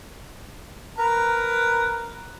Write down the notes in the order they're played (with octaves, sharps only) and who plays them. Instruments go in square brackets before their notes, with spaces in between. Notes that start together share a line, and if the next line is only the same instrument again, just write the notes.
[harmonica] A#4 B4 A#5